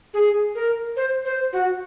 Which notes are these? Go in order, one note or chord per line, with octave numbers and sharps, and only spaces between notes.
G#4
A#4
C5
C5
F#4